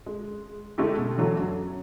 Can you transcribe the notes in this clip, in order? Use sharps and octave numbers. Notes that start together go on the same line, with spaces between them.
G#3
D3 G#3 A3 E4 G4
B2
D3 E3 F#3 A3
F#2 F#3